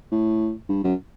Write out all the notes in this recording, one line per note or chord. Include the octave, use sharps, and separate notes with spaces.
A2
G2
F#2